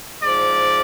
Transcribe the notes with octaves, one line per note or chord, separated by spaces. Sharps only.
G#2 F3 D5